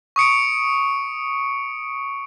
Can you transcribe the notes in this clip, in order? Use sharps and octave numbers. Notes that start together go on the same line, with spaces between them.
C#6 D#6 C#7 D7